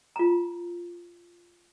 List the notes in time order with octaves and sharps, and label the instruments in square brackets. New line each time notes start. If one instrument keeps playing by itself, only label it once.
[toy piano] F4 A#5